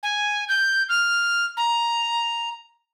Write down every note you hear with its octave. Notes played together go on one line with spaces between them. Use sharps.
G#5
G6
F6
A#5